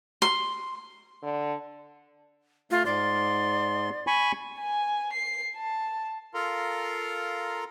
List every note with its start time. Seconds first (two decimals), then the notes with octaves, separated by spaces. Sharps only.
0.22 C6
1.23 D3
2.71 A3 F4
2.86 G#2 D5 C6
4.07 G#5 B5 C#6
4.59 G#5
5.13 C7
5.56 A5
6.34 F4 A4 A#4 F5 A#5 C6